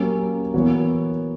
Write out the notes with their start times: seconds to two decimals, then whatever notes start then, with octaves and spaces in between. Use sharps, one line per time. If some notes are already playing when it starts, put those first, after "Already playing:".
Already playing: F#3 A#3 C#4 G4
0.54 E3 B3 F#4 A#4 C#5